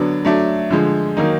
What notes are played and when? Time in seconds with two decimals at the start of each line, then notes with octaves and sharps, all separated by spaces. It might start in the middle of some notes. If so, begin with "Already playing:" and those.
Already playing: D3 F#3 B3 D4
0.25 F#3 A3 D4
0.70 D3 F3 G#3
1.17 D#3 F#3 A#3 D#4